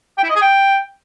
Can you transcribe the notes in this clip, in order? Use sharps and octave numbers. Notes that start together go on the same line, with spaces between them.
G5
E4
D#5
G#4
G5